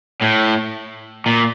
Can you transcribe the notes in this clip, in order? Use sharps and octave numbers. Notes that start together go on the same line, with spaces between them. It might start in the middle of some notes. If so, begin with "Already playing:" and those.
A2
A#2